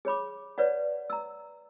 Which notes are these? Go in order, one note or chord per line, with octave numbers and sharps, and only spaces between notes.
G#4 C#5 B5 D6
B4 C#5 D5 E5 F#5
A#5 E6